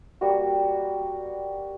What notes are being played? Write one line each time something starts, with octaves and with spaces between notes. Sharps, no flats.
G3 A#3 F#4